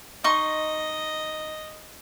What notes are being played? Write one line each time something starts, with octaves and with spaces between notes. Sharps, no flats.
D#4 D#5 C6 C#6